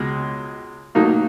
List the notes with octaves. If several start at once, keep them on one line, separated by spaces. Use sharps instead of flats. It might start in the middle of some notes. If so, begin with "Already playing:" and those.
Already playing: C#2 B2 G#3
A2 F#3 A#3 D#4